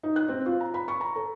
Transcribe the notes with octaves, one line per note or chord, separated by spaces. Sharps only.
D#4
F#6
C4
F4
A#5
B5
C#6
A#5
A4